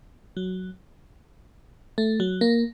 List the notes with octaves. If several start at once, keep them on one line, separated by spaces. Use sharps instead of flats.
F#3
A3
F#3
A#3